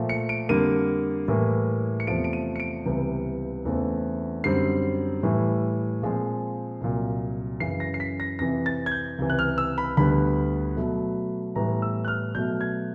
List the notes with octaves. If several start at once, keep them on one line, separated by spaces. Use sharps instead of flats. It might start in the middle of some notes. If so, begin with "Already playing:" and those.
Already playing: A#2 F3 A3
C#7
D7
F2 D3 G3 A#3 D#7
A2 E3 G3 A#3
C#7
E2 C3 F3 A3 D7
D7
D#7
C#7
D7
C#2 C3 E3 G3 B3
E2 C#3 E3 A3 C4
F#2 D3 G3 C4 C7
A2 E3 G3
A#2 F3 G#3 C4
C2 A#2 F#3
F#2 C#3 E3 C7
A#6
C7
B6
A#6
F2 C3 E3 A#6
A6
G#6
G6
C#2 C3 E3
F#6
F6
E6
B5
D2 D3 G3 B3 B5
B2 F#3 A3
A2 E3 G3 B3 A#5
E6
F#6
F6
B2 F#3 A3 G6
G#6